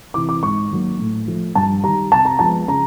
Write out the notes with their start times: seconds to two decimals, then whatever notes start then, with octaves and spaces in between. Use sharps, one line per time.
0.14 C3 E3 D6
0.29 D6
0.43 G#2 C#6
0.71 D#3 F#3 A#3
0.99 A2
1.27 F3 A3
1.55 G2 A5
1.83 D#3 G3 A#5
2.12 C3 A5
2.25 A#5
2.39 F3 G#3 B3 A5
2.68 C#3 A#5